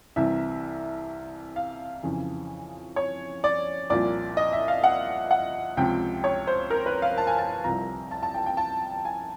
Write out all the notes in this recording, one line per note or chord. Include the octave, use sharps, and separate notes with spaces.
C2 C3 E3 E5
F5
F2 C#3 E3
C#5
D5
C2 A#2 F3 D5
D#5
E5
F5
F#5
F#5
C#2 C3 F3 G5
C#5
C5
A#4
B4
F5
A5
G#5
A5
C2 C3 F3 A#5
A5
A5
G5
G5
A5
G#5